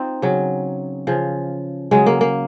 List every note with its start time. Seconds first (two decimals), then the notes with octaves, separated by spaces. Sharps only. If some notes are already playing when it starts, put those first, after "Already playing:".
Already playing: C4 D#4 F4
0.22 C#3 F#3
1.07 C#3 F3
1.91 C#3 F#3 G#3
2.06 A#3
2.21 A#3